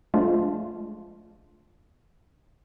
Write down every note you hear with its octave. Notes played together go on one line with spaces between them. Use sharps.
F3 G#3 A3 D4 F4